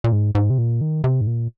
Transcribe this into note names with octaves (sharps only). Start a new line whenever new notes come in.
A#2
G#2
G#2
C3
A#2
D#3
C3
G#2
A#2